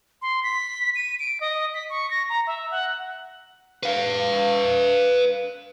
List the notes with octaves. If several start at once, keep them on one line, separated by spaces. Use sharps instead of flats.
C6
B6
D#7
D7
D#5
B6
C#6
A#6
A#5
E5
F#5
B4 F5